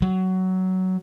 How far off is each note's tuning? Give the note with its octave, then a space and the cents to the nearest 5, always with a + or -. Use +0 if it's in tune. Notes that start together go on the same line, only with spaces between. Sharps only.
F#3 +15